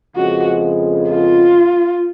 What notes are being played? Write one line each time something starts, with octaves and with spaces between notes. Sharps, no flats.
F2 C#3 F3 G#3 B3 F#4
F4